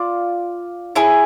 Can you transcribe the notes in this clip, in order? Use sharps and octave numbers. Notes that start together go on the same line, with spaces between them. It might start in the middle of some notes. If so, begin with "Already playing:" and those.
Already playing: F4 D5
E4 G#4 C#5